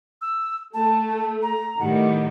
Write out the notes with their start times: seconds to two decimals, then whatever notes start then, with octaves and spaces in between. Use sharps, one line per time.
0.21 E6
0.74 A3 A5
1.42 A#5
1.80 A2 D#3 G3 F#5